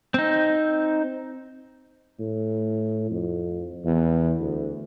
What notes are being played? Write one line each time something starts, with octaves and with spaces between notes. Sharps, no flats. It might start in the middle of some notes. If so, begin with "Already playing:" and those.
C4 D#4
A2
F2
E2
D2